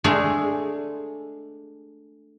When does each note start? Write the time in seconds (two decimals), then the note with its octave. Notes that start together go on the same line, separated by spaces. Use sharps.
0.04 G#3 A3 D4 G#4